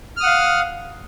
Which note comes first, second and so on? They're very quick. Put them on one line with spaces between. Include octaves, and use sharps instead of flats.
F6 D#6 F#5 F5